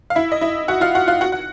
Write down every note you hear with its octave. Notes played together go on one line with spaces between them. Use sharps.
F5
E4 E5
D#5
E4 E5
F#4 F#5
F4 F5
F#4 F#5
F4 F5
F#4 F#5
F#5